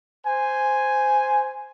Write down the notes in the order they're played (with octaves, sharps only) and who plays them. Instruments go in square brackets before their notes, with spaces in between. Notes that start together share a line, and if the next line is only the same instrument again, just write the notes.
[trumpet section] C5 G#5